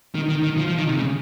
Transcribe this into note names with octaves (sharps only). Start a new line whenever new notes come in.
D#3
D#3
D#3
F3
F3
D#3
C3
C#3